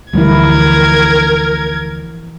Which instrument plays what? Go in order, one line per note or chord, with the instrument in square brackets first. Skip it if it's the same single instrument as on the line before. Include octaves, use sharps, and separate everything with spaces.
[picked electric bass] D2 G3 [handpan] E3 F3 E4 [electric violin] A#4 G#6